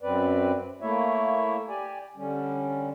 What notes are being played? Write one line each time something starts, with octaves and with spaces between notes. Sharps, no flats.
F#2 F#3 C4 B4 D5
A3 A#3 E4 C#5 E5
G4 D5 G#5
D3 G3 C#4